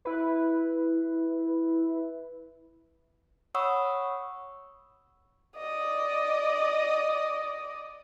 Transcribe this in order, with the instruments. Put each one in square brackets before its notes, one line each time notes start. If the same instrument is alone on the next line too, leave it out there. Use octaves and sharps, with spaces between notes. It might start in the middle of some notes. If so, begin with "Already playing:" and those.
[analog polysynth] E4 B4
[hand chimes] C#5 F#5 B5 C#6 D#6 E6
[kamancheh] D5 D#5